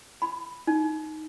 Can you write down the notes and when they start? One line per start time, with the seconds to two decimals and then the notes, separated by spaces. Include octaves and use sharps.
0.22 B5
0.67 D#4